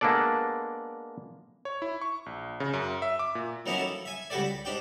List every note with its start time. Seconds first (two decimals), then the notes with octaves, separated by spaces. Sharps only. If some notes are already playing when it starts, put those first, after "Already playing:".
0.01 G#3 A#3 B3 D4 A4 D5
1.65 C#5
1.82 E4
2.01 C#6
2.26 A#1
2.60 C#3
2.73 F#2
3.02 E5
3.19 D6
3.35 A#2
3.66 D#3 F#3 A#3 B3 C#4 E4
3.79 A4
4.05 E5 G#5
4.30 C#2 G3 F#4 G4 A4 D5
4.44 B5
4.65 G#2 D4 G4 G5